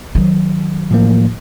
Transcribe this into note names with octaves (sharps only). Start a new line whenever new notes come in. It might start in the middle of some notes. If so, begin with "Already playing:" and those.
D#3 F#3
A2 F3 A#3